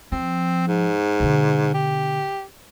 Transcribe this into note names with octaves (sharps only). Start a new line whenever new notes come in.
F3 C4
G#2
B2 D3
G4